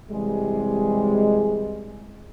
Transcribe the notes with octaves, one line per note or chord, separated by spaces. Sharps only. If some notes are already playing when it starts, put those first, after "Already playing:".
C3 E3 G3 G#3